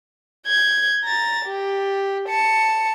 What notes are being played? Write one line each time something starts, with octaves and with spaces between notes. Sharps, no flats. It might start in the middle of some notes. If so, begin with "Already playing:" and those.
G6 G#6
A#5 A6
G4
A5 C#7